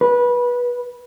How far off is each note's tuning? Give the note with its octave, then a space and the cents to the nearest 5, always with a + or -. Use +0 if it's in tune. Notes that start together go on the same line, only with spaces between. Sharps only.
B4 -20